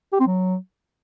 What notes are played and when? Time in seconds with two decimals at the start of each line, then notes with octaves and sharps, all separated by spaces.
0.13 G4
0.20 C4
0.27 F#3